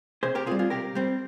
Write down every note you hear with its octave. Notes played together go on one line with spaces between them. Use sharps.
C3 G#4 C5
G4 A#4
C4 F4 G#4
G3
F4 G#4
C3 G4 A#4
G3 C4